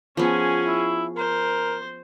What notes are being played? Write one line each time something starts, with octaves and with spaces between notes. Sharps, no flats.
F3 B3 C#4 G#4
E4
A#4 C5